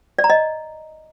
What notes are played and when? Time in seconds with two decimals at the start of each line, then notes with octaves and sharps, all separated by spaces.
0.19 D5
0.24 A#5
0.30 D#5